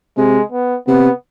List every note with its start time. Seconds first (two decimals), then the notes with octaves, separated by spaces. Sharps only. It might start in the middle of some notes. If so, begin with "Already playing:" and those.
0.17 C3 G#3
0.52 B3
0.88 C3 B3